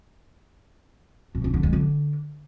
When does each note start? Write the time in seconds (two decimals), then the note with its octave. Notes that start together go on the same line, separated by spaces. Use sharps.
1.35 B2
1.44 D4
1.54 D3
1.63 G#3
1.73 D3